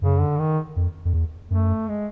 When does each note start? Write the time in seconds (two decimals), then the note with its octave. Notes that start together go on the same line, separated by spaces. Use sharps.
0.01 F#2 C#3
0.20 D3
0.39 D#3
0.76 F2
1.05 F2
1.14 E2
1.50 F#2 A3
1.88 G#3